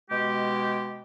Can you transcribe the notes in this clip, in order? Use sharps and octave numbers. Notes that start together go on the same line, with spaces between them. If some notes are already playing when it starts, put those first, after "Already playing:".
B2 G#3 G4